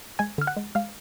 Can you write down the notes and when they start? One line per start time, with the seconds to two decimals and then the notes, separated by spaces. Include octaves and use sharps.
0.19 G#3 G#5 G#6
0.38 D3 F6
0.47 F#5 F#6
0.57 G#3
0.75 G#3 F5 F6